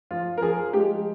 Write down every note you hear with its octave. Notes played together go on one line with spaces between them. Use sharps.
F3 F4
A#4
F3 G#4
G#3 G4